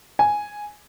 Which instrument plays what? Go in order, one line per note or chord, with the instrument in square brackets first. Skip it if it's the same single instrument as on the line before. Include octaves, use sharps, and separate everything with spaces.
[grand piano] G#5